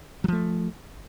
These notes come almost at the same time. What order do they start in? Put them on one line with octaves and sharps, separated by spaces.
F#3 F3 A3